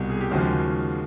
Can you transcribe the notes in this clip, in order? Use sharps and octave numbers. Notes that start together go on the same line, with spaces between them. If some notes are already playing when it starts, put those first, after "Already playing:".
Already playing: C2 B2 G3
G#4
G4
D#2 C#3 F3 G#3 F#4